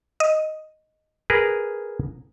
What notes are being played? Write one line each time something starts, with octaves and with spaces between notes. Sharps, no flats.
D#5
G#4 A#4 B4